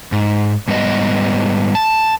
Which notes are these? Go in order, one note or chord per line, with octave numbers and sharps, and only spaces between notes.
G#2
G#2 G3 B3 B4 D#5
A5